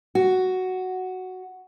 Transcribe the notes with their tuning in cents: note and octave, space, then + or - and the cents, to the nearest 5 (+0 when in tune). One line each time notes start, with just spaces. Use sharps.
F#4 +5